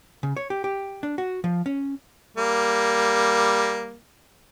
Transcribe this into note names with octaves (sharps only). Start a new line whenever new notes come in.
C#3
C#5
G4
G4
D4
F#4
F3
C#4
G3 A#3